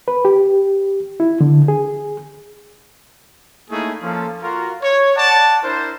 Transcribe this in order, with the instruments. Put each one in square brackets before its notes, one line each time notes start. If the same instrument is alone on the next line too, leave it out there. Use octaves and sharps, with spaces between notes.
[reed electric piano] B4
G4
E4
D3
G#4
[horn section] A3 A#3 C#4 D#4 E4 G#4
F3 A#3 C#4 F4 A4
F4 F#4 A#4
C#5
D5 F#5 A5
D4 E4 A#4 C5